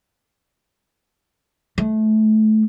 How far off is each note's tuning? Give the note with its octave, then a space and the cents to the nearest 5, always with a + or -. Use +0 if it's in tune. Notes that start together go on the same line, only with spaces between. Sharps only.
A3 -20